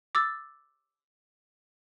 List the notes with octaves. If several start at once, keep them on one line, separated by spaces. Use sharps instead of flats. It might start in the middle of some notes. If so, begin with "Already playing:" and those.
D6 E6 A6